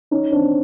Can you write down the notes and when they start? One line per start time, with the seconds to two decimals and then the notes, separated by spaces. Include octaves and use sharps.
0.11 C#4 D#4
0.32 C4 D4